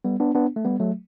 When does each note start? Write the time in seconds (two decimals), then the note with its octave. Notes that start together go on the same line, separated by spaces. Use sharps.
0.04 G3 B3
0.20 B3 D4
0.35 B3 D4
0.56 A3
0.65 G3 B3
0.80 F#3 A3